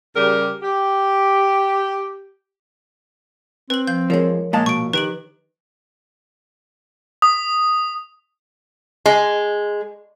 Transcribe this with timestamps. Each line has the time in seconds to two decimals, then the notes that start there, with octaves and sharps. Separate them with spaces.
0.16 C#3 G3 G4 A#4
0.62 G4
3.70 C4 B4 F#7
3.87 F3 G6
4.10 F3 G#3 A#4 C#5
4.53 A#2 G#3 F5 A5
4.66 B2 C#6 D7
4.93 D#3 G4 B4 D7 F#7
7.22 D#6
9.06 G#3